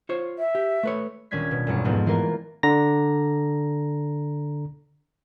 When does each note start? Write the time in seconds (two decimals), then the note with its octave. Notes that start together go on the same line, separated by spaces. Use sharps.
0.09 F4 C5 C#5
0.39 E5
0.55 G4
0.83 A3 B4 C#5
1.31 D#1 C#4 D4 G#6 B6
1.51 B2
1.67 B1 E2 G2 C#7
1.84 F2 G#2 B3 C4
2.06 E3 A#3 F4 A#4
2.63 D3 A#5 A#6